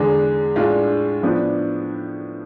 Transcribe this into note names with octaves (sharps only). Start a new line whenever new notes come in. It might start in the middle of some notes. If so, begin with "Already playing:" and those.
Already playing: E2 D3 G#3
A2 G#3 D4 F4
A2 F3 B3 D4